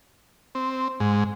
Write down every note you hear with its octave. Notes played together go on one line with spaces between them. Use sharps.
C4
G#2